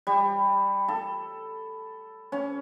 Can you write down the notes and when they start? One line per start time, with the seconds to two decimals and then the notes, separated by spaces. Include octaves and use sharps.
0.07 G3
0.88 A4
2.32 C#4